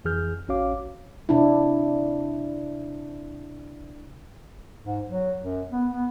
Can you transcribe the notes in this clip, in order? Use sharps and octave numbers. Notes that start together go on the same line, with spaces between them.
F2 E3 G#4 F6 G6
A1 C#4 F#4 C#5 F5 D6
C3 D4 E4
G#2
F#3
F#2
B3
B3